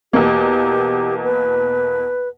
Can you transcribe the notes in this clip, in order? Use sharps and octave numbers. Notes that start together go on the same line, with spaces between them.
E2 B2 A#3 G4
B4